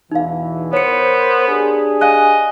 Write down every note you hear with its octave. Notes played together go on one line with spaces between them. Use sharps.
E2 B2 E3 D#4 F5
B3 A#4 C5 C#5 C#7
D4 G4 G#4
D#5 F5 G#5 F#6